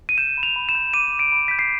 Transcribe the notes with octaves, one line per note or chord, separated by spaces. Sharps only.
D#7
G6 E7
B5
F7
B5
E7
G6
D6 D#7
D6
D7
B5
G6 B6
C7